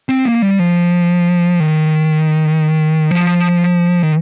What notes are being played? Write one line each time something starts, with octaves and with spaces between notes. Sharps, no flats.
C4
A#3
G3
F3
D#3
F3
D#3